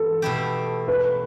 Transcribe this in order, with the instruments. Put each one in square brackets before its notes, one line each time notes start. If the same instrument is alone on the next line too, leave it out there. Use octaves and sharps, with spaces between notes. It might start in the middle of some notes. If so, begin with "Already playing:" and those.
Already playing: [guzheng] E3 B3 [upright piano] A4
[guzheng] B2 A3 E4 G4
[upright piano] B4